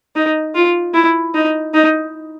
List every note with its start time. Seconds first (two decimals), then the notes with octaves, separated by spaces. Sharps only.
0.16 D#4
0.55 F4
0.94 E4
1.35 D#4
1.74 D#4